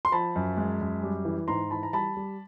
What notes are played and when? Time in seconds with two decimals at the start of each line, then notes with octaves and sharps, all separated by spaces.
0.05 C6
0.12 F3 A5 B5
0.36 F#2
0.57 G#3
0.81 F#2
1.03 G3
1.25 E3
1.48 G#2 A#5 C6
1.70 E3 A5 B5
1.83 A#5
1.93 G3 A5 B5
2.17 G3